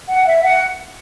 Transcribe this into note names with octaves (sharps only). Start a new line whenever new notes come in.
F#5
E5
F#5